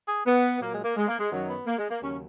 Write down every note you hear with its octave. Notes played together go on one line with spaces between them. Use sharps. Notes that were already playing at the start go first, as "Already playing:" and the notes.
G#4
B3
A#2 F#3 A#3
G#3
A#3
G#3
A#3
G#3
F#2 D#3 F#3
B3
A#3
G#3
A#3
D#2 C#3 F#3 C#4